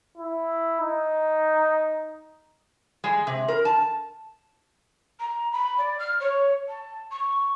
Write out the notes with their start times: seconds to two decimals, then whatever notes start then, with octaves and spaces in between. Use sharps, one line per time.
0.17 E4
0.81 D#4
3.04 G#3
3.27 C3
3.48 A#4
3.65 A5
5.19 A#5
5.52 B5
5.78 D5
5.99 F6
6.20 C#5
6.68 A5
7.11 C#6